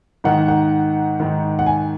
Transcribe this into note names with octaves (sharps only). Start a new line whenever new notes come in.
G#2 D#3 F#5
F#5
G#2 D#3
F#5
G#5